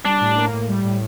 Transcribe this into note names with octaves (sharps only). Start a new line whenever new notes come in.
G3 D4
A2
A#3
A2
G3
A2